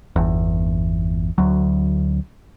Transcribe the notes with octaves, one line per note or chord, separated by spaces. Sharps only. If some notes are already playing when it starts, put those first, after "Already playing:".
G1 E2
D2 F#3